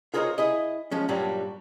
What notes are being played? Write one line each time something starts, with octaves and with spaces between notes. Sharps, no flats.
F4 G#4 A#4 C5 C#5 D#5
E4 G#4 D#5
F3 G#3 C#4
G2 A#2 F#3 G3 D4